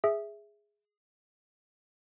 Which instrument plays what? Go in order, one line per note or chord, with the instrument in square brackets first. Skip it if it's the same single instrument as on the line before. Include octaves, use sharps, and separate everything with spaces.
[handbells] G#4 E5